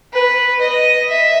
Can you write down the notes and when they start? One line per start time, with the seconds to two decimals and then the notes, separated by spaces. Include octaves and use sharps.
0.13 B4
0.61 D#5
1.10 E5